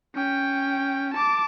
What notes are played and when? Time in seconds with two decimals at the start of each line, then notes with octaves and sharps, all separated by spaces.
0.15 C#4 G5
1.14 A5 D6